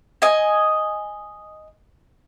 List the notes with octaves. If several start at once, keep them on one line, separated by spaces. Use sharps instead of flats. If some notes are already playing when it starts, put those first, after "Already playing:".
D#5 G#5